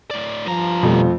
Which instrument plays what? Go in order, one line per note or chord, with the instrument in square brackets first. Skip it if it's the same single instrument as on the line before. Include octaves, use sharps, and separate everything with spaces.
[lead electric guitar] A2 D5
[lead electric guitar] G2 A#5 [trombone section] F3
[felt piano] F2 A3 [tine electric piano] B2 G3